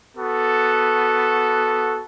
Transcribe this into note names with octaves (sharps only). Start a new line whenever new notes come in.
B3 F#4 A4